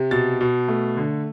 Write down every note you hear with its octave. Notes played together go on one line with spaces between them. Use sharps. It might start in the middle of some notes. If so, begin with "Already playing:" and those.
Already playing: C3
B2 A6
B2
A3
D3